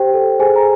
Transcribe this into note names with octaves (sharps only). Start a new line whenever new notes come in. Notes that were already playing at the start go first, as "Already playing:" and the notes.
Already playing: G4 C5 G5
A4
G#4 C5 G#5
A#5